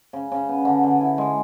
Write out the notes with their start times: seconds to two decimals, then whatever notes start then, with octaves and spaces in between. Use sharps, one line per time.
0.13 C#3
0.32 C#3
0.49 B3
0.65 D3
0.83 D3
1.01 E4
1.18 G#3